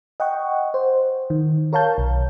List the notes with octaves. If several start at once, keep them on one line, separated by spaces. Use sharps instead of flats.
D#5 F#5 G5 C#6
C5
D#3
A#4 C#5 F5 A5 G6
B1